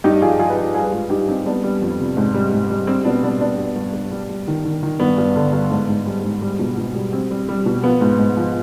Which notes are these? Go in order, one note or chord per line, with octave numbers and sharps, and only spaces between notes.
G2 D#4 G4
F3 F4 G#4
F3 F4 G#4
B4
F3 F4 G#4
G3 F4 G#4
B4
G#2 F4 G#4
G3 D#4 G4
G3 C4 D#4
G3 B3 D4
G3
F2
C3
G#2
G3
G#2
G3
G3 C4
B2 B3 D4
G3 B3 D4
G3 B3 D4
G2
G2
G2
G3
G3
D#3
D#3
D#3
G2 B3
G2
D3
G2
G#2
G#2
G3
G#2
G3
B2
B2
G3
G3 C4
G3
G3
B2
F3 B3
G#2
G#2
F3